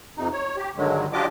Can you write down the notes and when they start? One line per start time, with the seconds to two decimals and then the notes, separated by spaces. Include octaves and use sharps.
0.17 F2 C3 D#4
0.33 C#5
0.57 G4
0.77 G2 D3 D#3 F#3 G#3
1.13 F#3 D4 F4 G4 D#5 D6